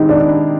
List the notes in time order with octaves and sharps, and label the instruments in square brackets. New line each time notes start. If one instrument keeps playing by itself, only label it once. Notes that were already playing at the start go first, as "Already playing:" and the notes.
Already playing: [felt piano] D#3 G#3 C4 E4 G4 [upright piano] D#4
[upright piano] D4